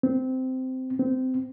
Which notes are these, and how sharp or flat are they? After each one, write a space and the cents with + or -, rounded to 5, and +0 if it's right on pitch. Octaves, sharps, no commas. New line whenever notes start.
C4 -15
C4 -20